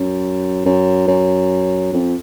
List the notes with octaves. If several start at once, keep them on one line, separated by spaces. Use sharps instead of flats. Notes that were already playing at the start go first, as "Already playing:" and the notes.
Already playing: F#2
F#2
F#2
F2